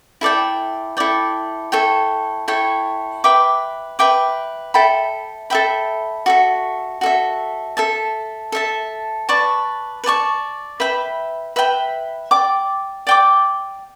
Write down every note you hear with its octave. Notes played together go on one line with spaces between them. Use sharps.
E4 A4 D5 G5
E4 A4 D5 G5
E4 A4 C#5 G5
E4 A4 C#5 G5
B4 E5 G5 D6
B4 E5 G5 D6
A4 E5 G5 B5
A4 E5 G5 B5
F#4 A4 E5
F#4 A4 E5
A4 E5 A5
A4 E5 A5
B4 D5 A5 C#6
B4 D5 A5 C#6
B4 E5 G5 B5
B4 E5 G5 B5
D5 G5 D6
D5 G5 D6